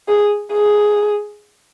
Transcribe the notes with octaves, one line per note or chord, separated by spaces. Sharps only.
G#4
G#4